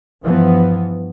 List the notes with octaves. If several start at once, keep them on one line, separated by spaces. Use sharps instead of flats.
G2 E3 F3 B3